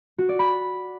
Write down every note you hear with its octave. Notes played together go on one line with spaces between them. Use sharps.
F#4
D5
B5